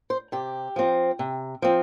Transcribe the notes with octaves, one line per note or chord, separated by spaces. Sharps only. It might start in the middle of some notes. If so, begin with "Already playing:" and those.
C5
C3 G4
F3 C4
C3
F3 C4